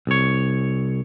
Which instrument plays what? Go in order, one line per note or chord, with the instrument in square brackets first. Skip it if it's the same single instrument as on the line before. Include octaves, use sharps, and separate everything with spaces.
[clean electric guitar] C2 C#5